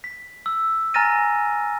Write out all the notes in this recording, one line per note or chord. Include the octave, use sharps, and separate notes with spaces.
B6
E6
G#5 A#5 F6 A6 A#6 D#7